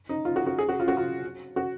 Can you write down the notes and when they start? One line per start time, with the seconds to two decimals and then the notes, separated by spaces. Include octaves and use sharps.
0.09 D#4
0.25 F4
0.36 F#4
0.46 F#4
0.59 G#4
0.69 F#4
0.80 F4
0.88 F#4
0.97 F4
1.56 F#4